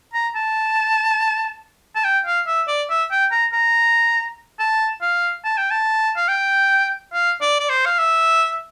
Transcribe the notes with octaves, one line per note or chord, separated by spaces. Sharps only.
A#5
A5
A5
G5
F5
E5
D5
E5
G5
A#5
A#5
A5
F5
A5
G5
A5
F5
G5
F5
D5
D5
C5
F5
E5